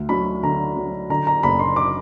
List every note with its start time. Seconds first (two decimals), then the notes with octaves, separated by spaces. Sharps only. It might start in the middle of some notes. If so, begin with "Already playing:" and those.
Already playing: D2
0.09 F#3 B5
0.43 D3 A#5
0.77 F#3
1.10 D3 A#5
1.27 A#5
1.43 F#1 B5
1.59 C6
1.76 D6